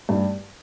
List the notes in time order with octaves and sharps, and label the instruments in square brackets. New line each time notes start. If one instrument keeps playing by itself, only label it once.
[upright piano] G2 G3